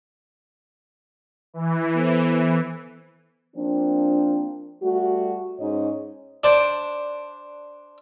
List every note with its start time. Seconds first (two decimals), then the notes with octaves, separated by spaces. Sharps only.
1.54 E3
1.94 B3 A4 C5
3.56 F3 A#3 C4 D4
4.82 G3 A3 F#4
5.59 G#2 C#4 D#4 C#5 D#5
6.44 D4 C5 D5